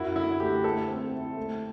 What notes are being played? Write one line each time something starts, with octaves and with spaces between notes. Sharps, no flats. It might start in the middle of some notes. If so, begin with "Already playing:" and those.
Already playing: F#2 E4 F#4
D3 E4
A3 G4
A3 A4
C4
E4
A3